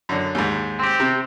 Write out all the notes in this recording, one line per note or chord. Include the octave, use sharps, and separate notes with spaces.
F#2 D3
D#2 G#2
C4 G4
C3